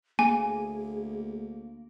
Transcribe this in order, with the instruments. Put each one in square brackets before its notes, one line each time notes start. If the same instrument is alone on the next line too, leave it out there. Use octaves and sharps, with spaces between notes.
[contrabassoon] D2 [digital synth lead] A#3 [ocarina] G#4 [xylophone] G#5